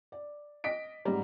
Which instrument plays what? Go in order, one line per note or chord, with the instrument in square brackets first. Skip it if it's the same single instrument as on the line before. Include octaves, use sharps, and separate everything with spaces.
[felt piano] D5
[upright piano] D#5 B6 D7
[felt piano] A1 G#2 A#5 [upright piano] G3